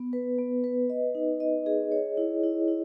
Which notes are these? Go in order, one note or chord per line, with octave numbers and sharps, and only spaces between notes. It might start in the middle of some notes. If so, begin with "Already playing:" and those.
Already playing: B3
B4
B3
B4
D#5
D#4
D#5
G#4
C#5
E4
E4
E4